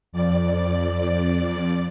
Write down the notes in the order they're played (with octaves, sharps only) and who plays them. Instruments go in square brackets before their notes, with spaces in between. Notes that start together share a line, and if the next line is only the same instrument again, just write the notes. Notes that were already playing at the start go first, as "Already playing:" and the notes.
[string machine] F2 D5